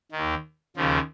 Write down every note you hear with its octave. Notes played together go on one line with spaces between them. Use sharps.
D#3
D#2
D#2 C#3 F3